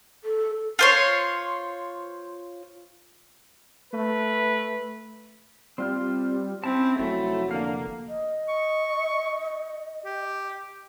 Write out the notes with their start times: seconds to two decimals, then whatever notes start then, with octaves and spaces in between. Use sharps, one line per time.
0.24 A4
0.79 F4 C5 C#5
3.93 A3 B4
5.78 G3 C4 F4 F6
6.64 C4 C#4 E4 A5
6.99 F1 F#3 A3 E4
7.51 D3 A#3 F5
8.09 D#5
8.49 C#6
10.05 G4